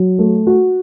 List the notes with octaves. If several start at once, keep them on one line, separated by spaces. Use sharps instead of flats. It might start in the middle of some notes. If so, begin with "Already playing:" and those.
Already playing: F#3
A3
F#4